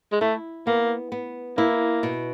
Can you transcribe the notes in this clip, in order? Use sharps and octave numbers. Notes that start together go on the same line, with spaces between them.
G#3
A3 E4
A#3 B3
B3
A#3 E4
B2